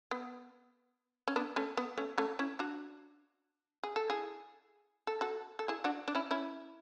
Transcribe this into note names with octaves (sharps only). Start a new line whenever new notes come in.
B3
C#4
B3 D4
A3 C#4
B3
A3 C#4
A3 C#4
C#4 E4
D4 F#4
G#4
A4
E4 G#4
A4
F#4 A4
A4
E4 G#4
D4 F#4
D4
C#4 E4
C#4 E4